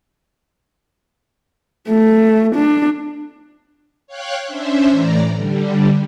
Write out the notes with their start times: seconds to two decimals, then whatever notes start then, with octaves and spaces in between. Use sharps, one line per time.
1.89 A3
2.55 D4
4.07 C#5 F5 G5 F#6
4.45 C#4 D4 C5 E5
4.89 A2 E3 D5 A#5
5.33 D3 G3